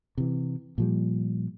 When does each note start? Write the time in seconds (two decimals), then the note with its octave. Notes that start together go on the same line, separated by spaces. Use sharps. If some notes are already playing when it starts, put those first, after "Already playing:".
0.18 C3 E3
0.78 A#2 F3 G3